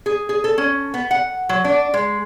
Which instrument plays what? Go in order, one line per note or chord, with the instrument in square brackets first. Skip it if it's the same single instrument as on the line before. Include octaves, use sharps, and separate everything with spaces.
[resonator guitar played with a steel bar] G#4
G#4
A4
C#4
B3
F#5
F#3
D4
G#3